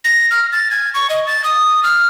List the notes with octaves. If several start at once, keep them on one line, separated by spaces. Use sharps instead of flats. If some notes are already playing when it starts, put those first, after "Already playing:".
A#6
F6
A6
G#6
C#6
D#5
A6
D#6
F6